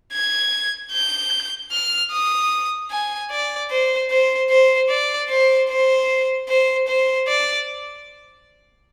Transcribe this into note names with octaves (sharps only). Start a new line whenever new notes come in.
G#6
G6
F6
D#6
G#5
D5
C5
C5
C5
D5
C5
C5
C5
C5
D5